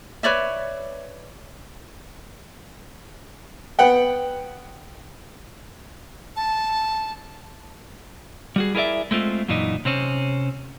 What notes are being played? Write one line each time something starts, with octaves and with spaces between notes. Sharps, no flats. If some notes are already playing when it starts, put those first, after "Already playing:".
B4 C#5 D5 E5
B3 F#5 G5
A5
G3 F#4 G#4
E4 G#4 A#4 C5 D5 E5
G#3 A3 C4 F4
F#2 A#2 E3 D4 D#4
C3 C4 C#4